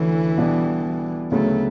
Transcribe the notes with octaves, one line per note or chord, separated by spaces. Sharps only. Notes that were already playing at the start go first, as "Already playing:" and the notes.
Already playing: D2 D3 E3 A3 C#4 E4
B2 G3 D4
D2 C#3 F#3 A3 B3